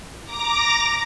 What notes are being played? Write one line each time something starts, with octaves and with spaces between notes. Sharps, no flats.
A#5 D6 A#6